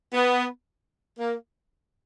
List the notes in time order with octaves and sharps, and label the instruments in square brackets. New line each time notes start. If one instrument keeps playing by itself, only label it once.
[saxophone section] B3
A#3